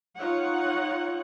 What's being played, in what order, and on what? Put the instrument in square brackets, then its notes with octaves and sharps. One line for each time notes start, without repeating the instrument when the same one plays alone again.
[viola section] D#4 F4 C#5 F#5